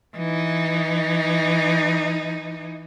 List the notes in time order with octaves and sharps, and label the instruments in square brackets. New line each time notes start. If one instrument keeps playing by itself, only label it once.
[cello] E3 D#4